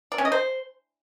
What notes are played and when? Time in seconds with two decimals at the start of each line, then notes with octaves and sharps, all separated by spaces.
0.12 D5
0.18 C#4
0.25 D#5
0.32 C5